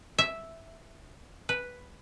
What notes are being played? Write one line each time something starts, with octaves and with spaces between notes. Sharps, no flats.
E5
B4